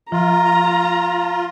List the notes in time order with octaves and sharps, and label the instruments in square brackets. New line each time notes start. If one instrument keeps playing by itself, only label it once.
[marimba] F3 [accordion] F4 [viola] A#5